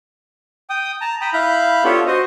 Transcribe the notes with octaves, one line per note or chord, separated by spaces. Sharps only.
G5 D#6
A5 A#5
G5 A#5 B5 D#6
E4 F5 B5 F#6 G6
B3 D4 F4 G4 A4 C#5
F#4 C5 D#5